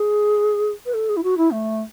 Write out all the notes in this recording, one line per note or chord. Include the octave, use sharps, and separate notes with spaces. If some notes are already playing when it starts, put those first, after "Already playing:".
Already playing: G#4
B4
A4
G#4
E4
F#4
E4
A3